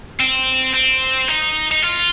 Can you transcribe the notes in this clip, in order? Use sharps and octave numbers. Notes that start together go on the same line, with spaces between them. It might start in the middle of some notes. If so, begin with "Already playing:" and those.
C4
C4
D#4
D#4
F4